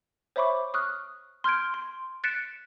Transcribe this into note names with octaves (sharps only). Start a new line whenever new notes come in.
C5 C#5 E5 B5 C#6 D6
C#6 D#6 F6 F#6
C6 F6 G6 G#6 D7
C6
F#6 A6 B6 C#7 D7 E7